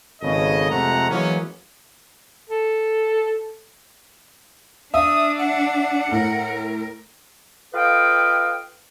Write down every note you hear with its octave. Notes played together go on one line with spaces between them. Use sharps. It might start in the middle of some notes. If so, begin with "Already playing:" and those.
G#1 C#3 B3 A4 D#5
F2 C3 G#3 A3 F#5 A#5
E3 F#3 G#3 A#3 B3 C#4
A4
D4 E5 D#6
F#5
A2 A#4
F4 A4 B4 D#5 F5 G5